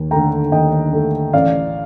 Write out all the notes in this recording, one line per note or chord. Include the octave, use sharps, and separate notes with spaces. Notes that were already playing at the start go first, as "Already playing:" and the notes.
Already playing: D#2
D3 A3 G5 A#5
D#2 D#5 G5
D3 A3
A1 D5 F5